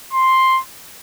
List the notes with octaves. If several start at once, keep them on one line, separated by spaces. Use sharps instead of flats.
C6